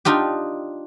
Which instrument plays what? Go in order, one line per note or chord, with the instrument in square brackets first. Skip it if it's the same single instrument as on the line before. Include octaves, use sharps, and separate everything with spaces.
[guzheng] D4 D#4 F4 G4